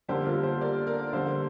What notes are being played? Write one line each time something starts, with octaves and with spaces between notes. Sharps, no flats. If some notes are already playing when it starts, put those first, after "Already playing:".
D3 G3 A#3 G4 C5
F4 A#4
G4 C5
A#4 D5
A#4 D5
D3 G3 A#3 C5 F5